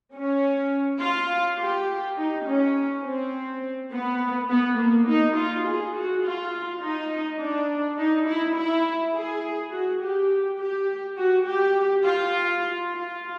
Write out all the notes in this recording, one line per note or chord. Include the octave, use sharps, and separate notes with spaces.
C#4
F4
G4
D#4
C#4
C4
B3
B3
A#3
D#4
F4
G#4
F#4
F4
D#4
D4
D#4
E4
E4
G#4
F#4
G4
G4
F#4
G4
F4
F4